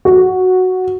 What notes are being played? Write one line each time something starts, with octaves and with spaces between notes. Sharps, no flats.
F#4